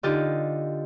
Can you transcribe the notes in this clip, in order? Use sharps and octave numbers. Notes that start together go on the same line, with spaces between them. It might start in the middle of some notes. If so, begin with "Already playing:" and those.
D3 D#4 F4 G4 D#5